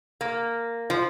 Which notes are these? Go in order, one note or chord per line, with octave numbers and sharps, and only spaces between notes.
A#3
F3